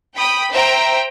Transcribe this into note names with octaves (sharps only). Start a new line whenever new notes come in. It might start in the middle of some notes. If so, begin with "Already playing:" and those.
G5 B5 D#6
C5 E5 G5 A#5